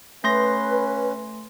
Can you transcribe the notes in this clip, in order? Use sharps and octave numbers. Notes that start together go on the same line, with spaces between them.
A3 C#4 B4 C6 A#6